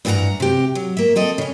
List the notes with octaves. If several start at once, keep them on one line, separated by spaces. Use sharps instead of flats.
G2 E3 E4 G#4 F#5 A#5
C3 G4
F#3
A#3 E5
C4 A4 D#5
C#3 C#4